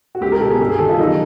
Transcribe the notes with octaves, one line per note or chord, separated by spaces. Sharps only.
F#4
C#2 G4
A#4
B2 A4
G#4
G2 G4
G#4
D#3 A4
F4
F#2 D#4